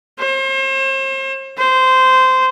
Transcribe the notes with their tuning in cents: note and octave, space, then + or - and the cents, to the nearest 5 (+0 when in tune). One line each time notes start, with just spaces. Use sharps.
C5 +40
C5 -15